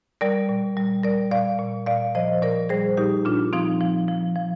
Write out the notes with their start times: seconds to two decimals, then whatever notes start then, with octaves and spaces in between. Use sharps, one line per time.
0.21 G3 A#4 D5
0.49 A#2
0.77 G3
1.03 G3 A#4 D5
1.31 A#2 D5 F5
1.59 A#2
1.86 A#2 D5 F5
2.15 F3 C5 D#5
2.42 A#2 A#4 D5
2.69 G3 G#4 C5
2.97 A#2 D#4 G4
3.25 A#2 D4 F4
3.53 F3 C4 D#4
3.81 F3
4.08 F3
4.36 F3